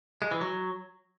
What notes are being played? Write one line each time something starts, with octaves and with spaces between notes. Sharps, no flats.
G#3
E3
F#3